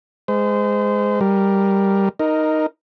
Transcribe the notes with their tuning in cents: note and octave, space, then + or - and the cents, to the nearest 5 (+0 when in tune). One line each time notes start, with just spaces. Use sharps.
G#3 +0 C5 -30
G3 +0 A#4 +0
D#4 +0 A#4 +0